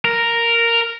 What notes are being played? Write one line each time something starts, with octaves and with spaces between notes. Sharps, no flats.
A#4